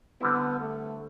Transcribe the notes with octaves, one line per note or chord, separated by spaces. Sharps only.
D3 G3 B3 C4 E4
A3